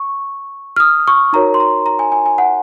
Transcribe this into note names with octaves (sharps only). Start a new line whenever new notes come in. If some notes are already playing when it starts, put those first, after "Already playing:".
Already playing: C#6
F6
D#6
C#6
D#4 F#4 A#4 C#5 A#5
C6
A#5
A#5
G#5
G#5
G#5
F#5